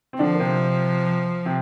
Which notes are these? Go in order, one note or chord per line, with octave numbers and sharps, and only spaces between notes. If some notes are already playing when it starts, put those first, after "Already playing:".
C4
D3 F3 D4
A#3
C3 C4
C3 C4